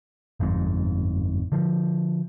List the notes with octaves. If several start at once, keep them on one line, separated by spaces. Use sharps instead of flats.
G1 F2 G#2
D3 F3